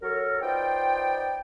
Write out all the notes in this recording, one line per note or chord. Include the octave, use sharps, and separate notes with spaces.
F#3 A4 A#4 C#5
B3 D#4 F4 C5 D5 G5